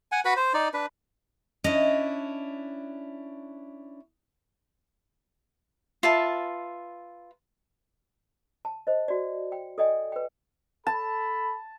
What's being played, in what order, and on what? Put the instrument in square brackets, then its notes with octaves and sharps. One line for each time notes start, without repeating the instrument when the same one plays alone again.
[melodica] F#5 G#5
F#4 B4 B5
C5
D#4 D5
D4 B4
[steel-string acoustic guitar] C#4 D4 E4 [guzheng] D#5
[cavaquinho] F4 B4 E5 A5
[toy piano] A5
C5 D#5
F#4 D5
G5
A4 D5 D#5 G5 G#5
B4 G5
[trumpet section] A4 B5 [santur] A5